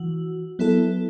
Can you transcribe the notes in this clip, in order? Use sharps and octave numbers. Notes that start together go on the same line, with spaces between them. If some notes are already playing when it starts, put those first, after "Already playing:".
Already playing: E3 F#4
F#3 B3 E4 A4